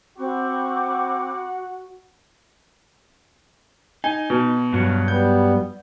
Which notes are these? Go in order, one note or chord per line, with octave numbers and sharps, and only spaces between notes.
C4 F#4 F#5 B5 C#6 D6
D#4 G#5
B2
G2 F#3
G3 B3 G6